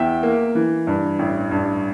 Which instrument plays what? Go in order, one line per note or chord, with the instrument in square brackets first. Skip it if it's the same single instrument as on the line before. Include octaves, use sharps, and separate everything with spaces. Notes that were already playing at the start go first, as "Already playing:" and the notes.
Already playing: [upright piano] E2 E5 G5
A#3
E3
G2
A1
G2